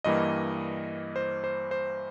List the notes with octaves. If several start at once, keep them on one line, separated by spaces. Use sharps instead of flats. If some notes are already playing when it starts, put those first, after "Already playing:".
G2 E3 G3 A#3 D#5
C5
C5
C5